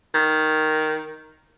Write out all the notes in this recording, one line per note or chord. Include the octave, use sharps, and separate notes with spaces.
D#3